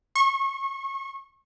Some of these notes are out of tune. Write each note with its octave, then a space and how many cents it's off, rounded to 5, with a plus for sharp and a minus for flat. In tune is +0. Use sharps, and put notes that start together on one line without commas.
C#6 -30